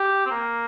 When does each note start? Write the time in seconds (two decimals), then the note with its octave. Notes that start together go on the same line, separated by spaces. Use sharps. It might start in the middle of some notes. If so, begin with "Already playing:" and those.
Already playing: G4
0.26 C4
0.31 A#3